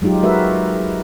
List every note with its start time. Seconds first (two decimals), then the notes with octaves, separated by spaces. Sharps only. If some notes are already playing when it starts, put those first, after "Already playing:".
0.02 F#3 G#3 D#4 F4 G4
0.23 G#3 F#4 A#4 B4 E5